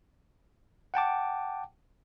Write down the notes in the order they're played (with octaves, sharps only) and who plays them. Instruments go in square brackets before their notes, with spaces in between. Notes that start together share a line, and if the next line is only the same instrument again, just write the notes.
[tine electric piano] F#5 G5 A5 D6